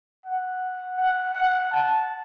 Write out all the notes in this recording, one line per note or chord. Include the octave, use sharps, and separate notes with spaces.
F#5
F#5
F#5
A5